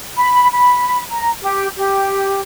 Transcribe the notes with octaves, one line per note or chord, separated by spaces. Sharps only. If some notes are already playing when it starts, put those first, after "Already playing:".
B5
B5
A#5
G4
G4